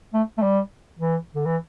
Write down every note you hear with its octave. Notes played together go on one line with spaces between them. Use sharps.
A3
A3
G3
E3
D3
E3